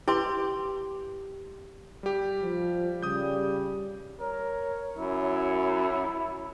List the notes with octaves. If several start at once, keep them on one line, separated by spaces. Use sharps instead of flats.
E4 G4 B4 C6
G3 G4
F3
C#3 G3 D#6 G6
A#4 C#5
F#2 E4